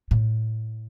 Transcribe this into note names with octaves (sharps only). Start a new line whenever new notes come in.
A2